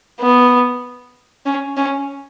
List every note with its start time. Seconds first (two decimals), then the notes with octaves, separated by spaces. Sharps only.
0.21 B3
1.46 C#4
1.77 C#4